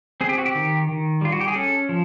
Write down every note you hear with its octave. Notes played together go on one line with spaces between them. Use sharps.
C4 G#4
G4
F#4
G4
D#3
D#3
G3 F4
F#4
G4
G#4
C#4 A4
F3